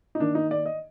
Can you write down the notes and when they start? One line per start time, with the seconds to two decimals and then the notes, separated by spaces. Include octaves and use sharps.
0.15 D#4
0.20 D#3 A#3 D4
0.35 D#4
0.51 D5
0.66 D#5